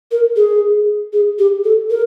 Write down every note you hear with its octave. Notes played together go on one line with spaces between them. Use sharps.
A#4
G#4
G#4
G4
A4
A#4